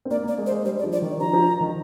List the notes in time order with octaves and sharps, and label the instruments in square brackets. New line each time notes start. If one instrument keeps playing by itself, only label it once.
[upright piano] C4
[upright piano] A#3 [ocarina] D5
[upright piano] A#3 [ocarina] D5
[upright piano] G#3
[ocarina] C5
[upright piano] G#3
[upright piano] G3 [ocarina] C5
[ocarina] D5
[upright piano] F3
[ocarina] D5
[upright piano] D#3
[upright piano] F3 [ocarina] A#5
[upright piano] F3
D#3